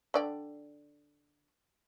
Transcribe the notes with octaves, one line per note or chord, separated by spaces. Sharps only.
D3 D5 G5